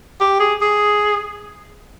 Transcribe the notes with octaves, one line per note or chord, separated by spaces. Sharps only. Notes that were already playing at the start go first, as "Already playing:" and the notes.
G4
G#4
G#4